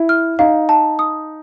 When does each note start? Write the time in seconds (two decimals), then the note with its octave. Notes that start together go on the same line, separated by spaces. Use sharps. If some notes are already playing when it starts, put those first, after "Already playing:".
Already playing: E4
0.09 F6
0.39 D#4 F5
0.69 A5
0.99 D#6